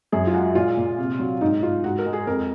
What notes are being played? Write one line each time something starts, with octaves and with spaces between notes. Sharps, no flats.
F#2 G#4
F4
G#3 F#4
A#2 F4
A#2
C3
F#3
G#2 D#4
G#2 F4
G#2 F#4
A#4
G#3
G#4
F2 A#4